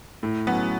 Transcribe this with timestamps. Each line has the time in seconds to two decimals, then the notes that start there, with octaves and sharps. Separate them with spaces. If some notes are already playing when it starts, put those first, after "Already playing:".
0.23 A2
0.47 F#3 B3 C#4